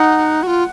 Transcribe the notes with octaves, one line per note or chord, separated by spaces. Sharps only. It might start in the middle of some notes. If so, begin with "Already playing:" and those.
Already playing: D#4 F#5
F#4
F4